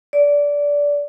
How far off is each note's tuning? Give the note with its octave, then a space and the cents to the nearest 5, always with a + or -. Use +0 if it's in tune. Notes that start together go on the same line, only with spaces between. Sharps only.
D5 -20